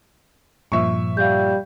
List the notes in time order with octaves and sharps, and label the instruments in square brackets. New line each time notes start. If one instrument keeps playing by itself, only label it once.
[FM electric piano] G2 A#2 F3 [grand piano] E5 C#6
[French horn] G3 [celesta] F5 G6